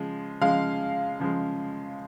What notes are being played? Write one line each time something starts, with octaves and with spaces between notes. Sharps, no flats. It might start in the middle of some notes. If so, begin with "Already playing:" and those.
Already playing: C#3 F3 G#3
C#3 F3 G#3 F5
C#3 F3 G#3